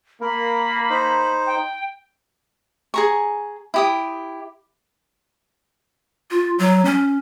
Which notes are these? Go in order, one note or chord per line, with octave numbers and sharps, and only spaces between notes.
A#3 A#4 B5
D#4 C5
G5
G#4 A#5 C#6
E4 G4 D#6
F4
F#3
C#4